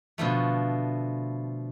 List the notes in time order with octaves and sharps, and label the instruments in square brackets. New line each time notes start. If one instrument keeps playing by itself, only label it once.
[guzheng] B2 D3 F3 A3